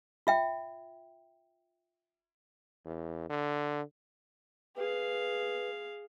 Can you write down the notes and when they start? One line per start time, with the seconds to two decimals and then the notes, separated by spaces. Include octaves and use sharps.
0.27 F4 E5 G5
2.85 E2
3.29 D3
4.76 G#4 B4 F5